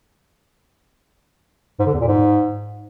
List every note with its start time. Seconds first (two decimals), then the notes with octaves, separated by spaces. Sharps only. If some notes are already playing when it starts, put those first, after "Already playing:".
1.79 G#2
1.86 D3
1.93 E2
2.00 A#2
2.07 G#2